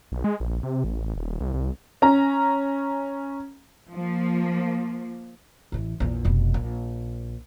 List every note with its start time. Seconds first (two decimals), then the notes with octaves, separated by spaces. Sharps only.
0.12 B1
0.24 G#3
0.40 A#1
0.63 C3
0.84 A1
1.16 D#1
1.41 C2
1.54 C2
2.02 C#4 A#5
3.93 F3 A#3
5.72 A1 E3
6.00 A#1 E2
6.25 F1 B2
6.54 A#1